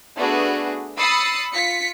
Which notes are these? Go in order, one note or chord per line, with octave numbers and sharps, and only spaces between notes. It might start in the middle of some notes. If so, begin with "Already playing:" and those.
A3 B3 D4 F#4 G#4
B5 D#6 E6 A6 C7 C#7
F4 B6 C#7